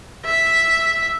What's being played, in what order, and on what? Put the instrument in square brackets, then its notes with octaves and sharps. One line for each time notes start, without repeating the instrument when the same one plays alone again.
[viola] E5